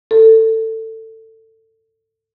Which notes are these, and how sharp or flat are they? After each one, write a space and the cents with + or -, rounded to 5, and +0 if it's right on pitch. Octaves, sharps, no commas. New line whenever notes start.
A4 +20